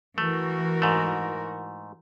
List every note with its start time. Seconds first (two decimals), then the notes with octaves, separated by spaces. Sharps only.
0.18 E3 A3 F#4 A#4
0.82 G#2 A3